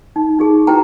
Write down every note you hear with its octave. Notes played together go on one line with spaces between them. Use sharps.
D#4
D#4 G4 G#4
E4 F#4 B4 G5 A#5